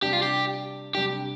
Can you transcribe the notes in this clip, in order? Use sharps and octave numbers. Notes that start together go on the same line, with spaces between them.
C3 G3 D4 G4
F4
G4
C3 G3 D4 G4